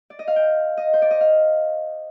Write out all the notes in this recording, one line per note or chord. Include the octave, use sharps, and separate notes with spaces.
D5
D#5
F5
G5
D#5
C5
D5
D#5
F5